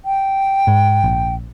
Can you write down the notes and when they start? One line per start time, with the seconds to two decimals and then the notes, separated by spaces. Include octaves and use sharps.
0.05 G5
0.67 G#2
1.04 A#1